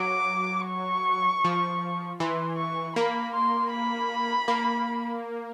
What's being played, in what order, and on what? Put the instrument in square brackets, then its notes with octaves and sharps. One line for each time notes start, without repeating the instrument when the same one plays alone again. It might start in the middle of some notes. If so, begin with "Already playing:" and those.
Already playing: [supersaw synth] F#3 [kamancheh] D6
[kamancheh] C#6
[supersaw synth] F3
[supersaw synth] E3 [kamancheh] C6
[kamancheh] C#6
[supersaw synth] A#3 [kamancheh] B5
[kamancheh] C6
B5
[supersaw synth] A#3